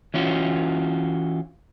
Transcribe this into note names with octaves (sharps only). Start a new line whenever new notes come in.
E3 C#4 F4 F#4